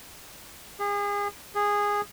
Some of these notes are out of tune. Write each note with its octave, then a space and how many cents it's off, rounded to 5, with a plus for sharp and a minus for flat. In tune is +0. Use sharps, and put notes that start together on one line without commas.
G#4 -35
G#4 -15